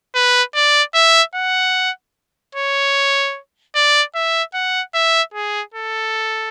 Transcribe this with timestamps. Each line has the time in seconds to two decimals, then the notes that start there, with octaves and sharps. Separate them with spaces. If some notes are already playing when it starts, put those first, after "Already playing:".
0.15 B4
0.55 D5
0.94 E5
1.35 F#5
2.55 C#5
3.75 D5
4.15 E5
4.54 F#5
4.94 E5
5.34 G#4
5.74 A4